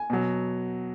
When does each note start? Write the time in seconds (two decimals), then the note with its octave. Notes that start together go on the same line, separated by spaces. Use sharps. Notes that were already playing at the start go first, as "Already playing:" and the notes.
Already playing: G#5
0.10 B2 F#3